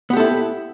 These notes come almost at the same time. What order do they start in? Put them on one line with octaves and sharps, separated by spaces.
B3 G4 A4 E4